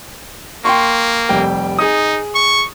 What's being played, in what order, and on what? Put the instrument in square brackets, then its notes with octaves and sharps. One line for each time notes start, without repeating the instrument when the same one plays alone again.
[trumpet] A#3 [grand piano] G5 C6 C#6
[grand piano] F1 G3 G5
[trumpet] D#4 [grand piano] G#4 D#6
[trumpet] C#6